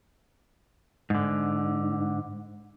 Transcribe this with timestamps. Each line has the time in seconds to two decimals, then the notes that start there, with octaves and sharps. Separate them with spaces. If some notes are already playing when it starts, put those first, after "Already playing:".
1.10 G#2 D3